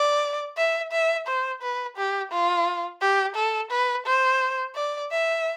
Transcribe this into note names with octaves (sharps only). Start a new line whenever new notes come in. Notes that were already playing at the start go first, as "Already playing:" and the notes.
Already playing: D5
E5
E5
C5
B4
G4
F4
G4
A4
B4
C5
D5
E5